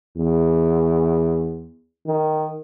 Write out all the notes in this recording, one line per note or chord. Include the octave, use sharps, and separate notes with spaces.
E2
D#3